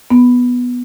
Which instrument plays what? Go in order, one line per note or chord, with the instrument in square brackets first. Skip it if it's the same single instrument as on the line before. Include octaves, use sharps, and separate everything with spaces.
[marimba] B3